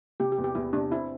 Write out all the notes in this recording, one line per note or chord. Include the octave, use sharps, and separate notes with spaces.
C3 G4
G4
E2
G4
E2 E4
C3 D4
C4 E4